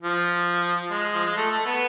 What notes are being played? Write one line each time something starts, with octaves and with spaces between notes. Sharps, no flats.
F3
G#3
F3
G#3
A3
A3
B3